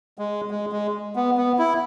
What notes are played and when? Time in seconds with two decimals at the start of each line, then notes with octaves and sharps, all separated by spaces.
0.18 G#3
0.51 G#3
0.72 G#3
1.16 B3
1.37 B3
1.58 E4